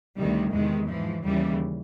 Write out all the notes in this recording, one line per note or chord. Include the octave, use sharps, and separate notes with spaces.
D2 C3 D#3 G3
E2 C3 D#3 G#3
G#2 E3 F3
D#2 C#3 E3 G3